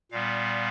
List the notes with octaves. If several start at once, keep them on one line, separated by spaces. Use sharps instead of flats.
A#2 G3 B3 F5